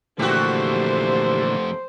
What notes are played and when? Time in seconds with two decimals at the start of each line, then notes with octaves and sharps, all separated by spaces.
0.19 F2 A#2 D3 E3 A3 F#4 G4 C5